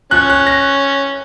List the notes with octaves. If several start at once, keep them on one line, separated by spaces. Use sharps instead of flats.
F3 C#4 F#6
F#6
A#6